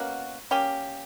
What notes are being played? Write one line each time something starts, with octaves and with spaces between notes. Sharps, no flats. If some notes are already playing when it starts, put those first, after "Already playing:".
Already playing: B2 A#3 C#4 F#4
A#3 C#4 G4